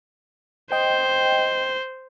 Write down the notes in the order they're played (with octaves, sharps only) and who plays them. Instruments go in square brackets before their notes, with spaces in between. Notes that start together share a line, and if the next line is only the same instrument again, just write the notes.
[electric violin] C5 [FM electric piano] D#5 G5